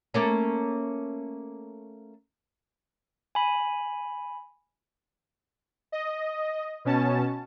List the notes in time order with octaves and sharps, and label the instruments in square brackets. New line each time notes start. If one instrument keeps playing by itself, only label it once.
[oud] A3 A#3 C#4
[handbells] G#5 B5
[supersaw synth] D#5
B2 C#4 A5